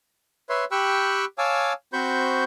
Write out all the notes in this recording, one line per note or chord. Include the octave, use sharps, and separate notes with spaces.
B4 C#5 E5 C6
G4 G5 B5 C#6 E6 F#6
C#5 F5 G#5 A5 D6 E6
C4 F#4 C5 B5 C#6 G6